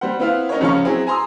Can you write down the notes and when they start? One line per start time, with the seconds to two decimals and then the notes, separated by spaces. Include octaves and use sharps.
0.01 G3 C5 F#5
0.19 B3 C4 E4 F4 F5 F#5
0.49 C#4 D#4 A#4 C#5
0.61 C#2 F3 C#4 C#5 F5 C#6
0.85 F#3 C4 E4 G#4
1.07 G#5 A#5 C6 D#6 E6